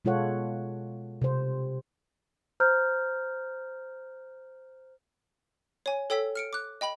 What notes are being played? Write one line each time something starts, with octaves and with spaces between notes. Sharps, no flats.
B2 G#3 F4 A4 C#5 F#5
C3 C5
C5 A#5 F6 G6
C#5 G#5
A4 C#5 G5 E6 B6
F6 C#7 D7
D6 F#6
D#5 G5 B5 F#7